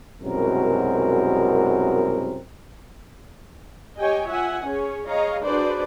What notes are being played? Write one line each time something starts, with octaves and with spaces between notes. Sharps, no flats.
C2 F#2 B2 G#3 C4 A#4
G4 C#5 D#5 G5 G#5
F4 E5 F#5 G#5
C#4 G#4 C#5
G#4 C#5 D#5 F5 A#5
D4 F#4 G#4 B4 C5 D5